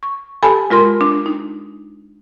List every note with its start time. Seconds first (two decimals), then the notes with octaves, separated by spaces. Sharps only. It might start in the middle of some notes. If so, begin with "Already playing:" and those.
0.03 C#6
0.43 G4 A4 G#5 A5 B5
0.70 G#3 F4 A#4 C6
1.01 D4
1.26 D#4